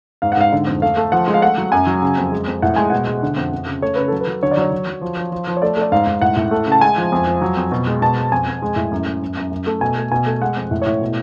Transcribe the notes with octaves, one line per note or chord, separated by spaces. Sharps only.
G#2 F5
F#5
G#2 F5
D3
F2
A3 F5
A3
F3 F#5
G#3
F5
A3 F#5
F#3
F#2 G#5
F#3
C#3
F2
G#3
F2
A2 F#5
G#3 G#5
B2 F#5
G#3
D3
F2
F2
C#3
A3 C#5
C#3 B4
F#3 A4
B4
F#3
D3 C#5
D5
F#3 C#5
F#3
F#3
F3
F3
F3
F3
C#5
A3 D5
A3 D5
G#2 F5
G#2
A2 F#5
A2
A3
C#3
A5
G#3 G#5
F3
F2
F3
F#3
F2
B2
G#3
B2 A5
G#3
F2 G#5
F2
G#3
A2
F#2
F#2
F#2
F#2
F#2
A3
B2 G#5
A3
B2 G#5
A3
G#3 F#5
F2
A2
C#5
A2
B2